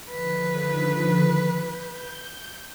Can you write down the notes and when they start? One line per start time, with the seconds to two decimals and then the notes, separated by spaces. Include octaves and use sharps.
0.11 D3 D#3 F3 B4
1.55 G6